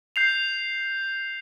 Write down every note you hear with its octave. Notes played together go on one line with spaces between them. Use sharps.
G6 C7 F7